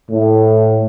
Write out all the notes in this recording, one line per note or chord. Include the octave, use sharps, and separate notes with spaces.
A2